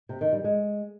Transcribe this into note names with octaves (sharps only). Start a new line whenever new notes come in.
C3
D#3
G3
G#3